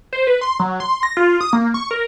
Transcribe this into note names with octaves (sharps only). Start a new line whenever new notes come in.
C5
B4
C6
F#3
C6
A#6
F4
D#6
A#3
C#6
A#4